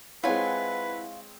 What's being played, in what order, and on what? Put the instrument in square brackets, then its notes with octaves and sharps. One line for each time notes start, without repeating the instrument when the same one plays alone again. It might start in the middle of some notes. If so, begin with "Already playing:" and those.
[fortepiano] G#3 C4 C#5 [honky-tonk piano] E4 F#5 [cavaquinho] F4 G#5 [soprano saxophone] B4